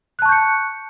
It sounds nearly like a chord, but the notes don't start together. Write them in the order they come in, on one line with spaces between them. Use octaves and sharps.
F#6 A5 C#6 G6 C#7